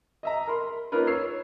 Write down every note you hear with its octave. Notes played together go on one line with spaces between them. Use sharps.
D#5 E5 A#5
A#4 B5 C6
A#3 C#4 D#4 F4 A#4 B4
C#5 E6 C7